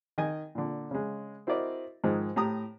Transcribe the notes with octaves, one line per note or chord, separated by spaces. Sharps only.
D#3 D#5 G#5
A#2 D3
C#3 G#3
C4 E4 F#4 A#4 D5 D#5
G#2 D#3 F3 G#3
A2 G4 A#5 D#6